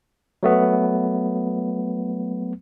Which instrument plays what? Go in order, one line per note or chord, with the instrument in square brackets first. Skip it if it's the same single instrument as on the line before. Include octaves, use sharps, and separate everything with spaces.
[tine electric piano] F#3 A3 B3